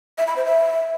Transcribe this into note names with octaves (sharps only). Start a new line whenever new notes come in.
E5
B5
C5
E5